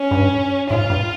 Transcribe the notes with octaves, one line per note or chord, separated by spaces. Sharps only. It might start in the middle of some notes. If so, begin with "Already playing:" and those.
Already playing: C#4
G2
G#2 F4
G2